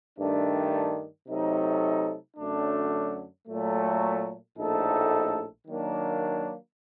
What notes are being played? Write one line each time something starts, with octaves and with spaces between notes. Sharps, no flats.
G2 D#3 A3 D4
C3 F#3 A3 D#4 A4
F#2 D3 F#3 A3 D4
A#2 F#3 A3
A#1 A2 A3 D#4 A4
D#3 F#3 A#3 D4